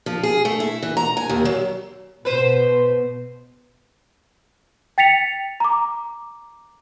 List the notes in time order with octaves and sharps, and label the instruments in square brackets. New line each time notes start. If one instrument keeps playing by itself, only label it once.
[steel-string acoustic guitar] F3
G#4
A3
E4
E3
A#5
G#5
D#2
F#3
[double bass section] B2 [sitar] B4 C5
[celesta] G5 A6 B6 C#7 F7
A#5 D6